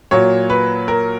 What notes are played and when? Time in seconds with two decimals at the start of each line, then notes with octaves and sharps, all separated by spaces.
0.11 A#2 F#3 C#5
0.50 B4
0.88 A#4